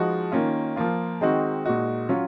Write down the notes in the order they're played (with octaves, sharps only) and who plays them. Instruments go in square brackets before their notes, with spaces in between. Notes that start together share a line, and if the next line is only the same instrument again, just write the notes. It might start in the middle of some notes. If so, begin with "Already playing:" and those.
Already playing: [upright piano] F3 G#3 D#4 F#4
D#3 A#3 C#4 F4
F3 A#3 F4
D#3 G#3 C4 D#4 F#4
A#2 G#3 D#4 F#4
F#3 C#4 F4